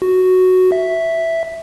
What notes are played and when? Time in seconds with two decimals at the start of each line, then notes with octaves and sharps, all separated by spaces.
0.02 F#4
0.72 E5